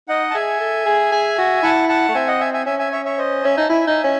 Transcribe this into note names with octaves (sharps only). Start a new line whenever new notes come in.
D#4 D#5 F#5
A5
G#4 E5 G#5
A4
G#4
G#4
F#4
E4 F#5 A5
F#5 A5
A3
C4 E5 G#5
D#5 F#5
E5 G#5
E5 G#5
C#4 E5 G#5
E5 G#5
C#5 E5
C#5 E5
C5 D#5
C#4 E5 G#5
D#4 A5
E4 E5 G#5
D#4
C#4